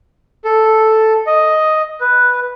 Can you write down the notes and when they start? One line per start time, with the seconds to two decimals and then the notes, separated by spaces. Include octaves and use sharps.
0.45 A4
1.27 D#5
2.01 B4